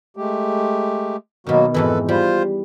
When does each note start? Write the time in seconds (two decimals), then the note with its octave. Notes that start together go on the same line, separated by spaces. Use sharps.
0.17 G#3 A3 G4
1.47 B2 D#3 F#3 A#3 F#4
1.74 F2 G#2 E3 A4 B4
2.09 G3 F4 C5